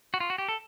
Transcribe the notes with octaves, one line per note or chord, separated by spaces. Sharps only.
F#4
F4
F#4
G4
A4